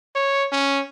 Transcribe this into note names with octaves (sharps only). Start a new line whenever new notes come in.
C#5
C#4